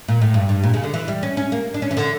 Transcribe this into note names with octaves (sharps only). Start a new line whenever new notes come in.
A#2
A2
G2
G2
A#2
C#3
D3
E3
G3
C#4
C#4
A#3
D4
C#4
E3
D3